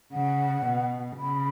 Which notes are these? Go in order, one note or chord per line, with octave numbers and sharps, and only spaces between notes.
C#3 F#5
B2
C#3 B5